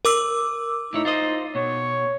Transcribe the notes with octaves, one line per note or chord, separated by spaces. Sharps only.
A#4 D6 E6
A2 D#4 E4 C#5
F4 C5 D#5
B2 C#5